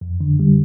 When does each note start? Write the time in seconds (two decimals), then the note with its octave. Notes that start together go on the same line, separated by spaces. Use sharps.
0.01 F2
0.20 D3
0.39 G3